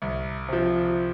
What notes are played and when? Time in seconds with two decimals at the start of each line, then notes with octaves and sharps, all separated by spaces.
0.02 C2
0.48 C3 F3